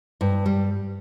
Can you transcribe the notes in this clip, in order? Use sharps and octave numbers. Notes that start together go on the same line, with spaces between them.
G2
G3